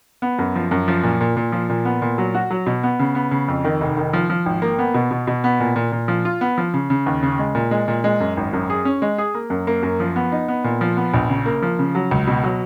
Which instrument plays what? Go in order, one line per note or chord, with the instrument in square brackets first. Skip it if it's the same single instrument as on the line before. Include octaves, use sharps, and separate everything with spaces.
[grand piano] B3
F#2
F3
F#2
F3
A#2
A#2
A#2
F3
A#2
B3
A#2
F#3
F#4
F#3
B2
B3
C#3
B3
C#3
F2
D#3
F1
D#3
F3
F3
G#1
A#3
B3
B2
B2
B2
B3
A#2
A#2
A#2
F3
F4
B3
F3
C#3
C#3
D#2
C#3
G#3
A#2
G#3
A#2
G#3
F#2
G#1
F#2
G#4
C#4
G#3
G#4
A#3
F#2
A#3
F#2
F3
B3
D#4
B3
A#2
F3
B3
A#1
C#3
A#3
F3
C#3
F#3
C#2
B2
F#3